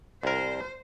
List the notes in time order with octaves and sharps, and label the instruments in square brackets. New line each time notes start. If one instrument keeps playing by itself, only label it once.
[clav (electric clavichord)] C2 A#4 [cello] C5